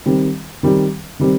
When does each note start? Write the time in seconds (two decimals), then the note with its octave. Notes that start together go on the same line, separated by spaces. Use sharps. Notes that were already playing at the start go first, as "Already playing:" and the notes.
0.06 D#3 G3 C4
0.63 D#3 G3 C4
1.19 D#3 G3 C4